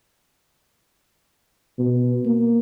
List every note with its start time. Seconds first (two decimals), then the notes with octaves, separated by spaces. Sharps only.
1.79 B2
2.25 A#3